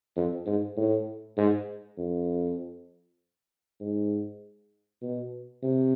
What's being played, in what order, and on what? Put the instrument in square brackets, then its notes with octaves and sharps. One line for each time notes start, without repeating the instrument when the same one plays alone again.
[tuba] F2
G#2
A2
G#2
F2
G#2
B2
C3